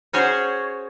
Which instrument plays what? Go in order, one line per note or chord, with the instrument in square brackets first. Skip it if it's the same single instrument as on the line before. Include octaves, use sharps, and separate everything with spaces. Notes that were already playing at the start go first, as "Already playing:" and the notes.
[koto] C#4 F#4 G#4 C5 C#5